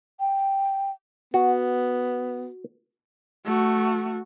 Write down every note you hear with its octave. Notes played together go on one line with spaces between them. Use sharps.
G5
B3 F#4
A3 F#4